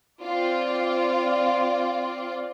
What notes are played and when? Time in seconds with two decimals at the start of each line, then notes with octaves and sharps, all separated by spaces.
0.22 C4 F4 D5